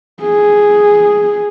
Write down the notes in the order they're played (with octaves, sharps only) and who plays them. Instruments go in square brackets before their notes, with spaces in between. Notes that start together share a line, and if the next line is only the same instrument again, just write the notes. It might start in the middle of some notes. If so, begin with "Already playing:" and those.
[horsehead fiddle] G#4